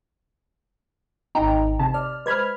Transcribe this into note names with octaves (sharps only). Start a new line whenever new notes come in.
G#1 D#4 G5 A#5
C3 A5
D5 F6
G#3 B4 C5 B5 F6 G#6